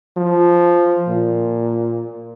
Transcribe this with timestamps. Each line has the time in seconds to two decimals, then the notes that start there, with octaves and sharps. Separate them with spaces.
0.17 F3
1.08 A#2